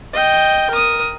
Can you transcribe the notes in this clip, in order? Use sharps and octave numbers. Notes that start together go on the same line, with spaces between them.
D#5 G5
A#4 D#6